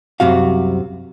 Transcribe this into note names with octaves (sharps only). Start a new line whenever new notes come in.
C2 F#2 C3 F#4 F5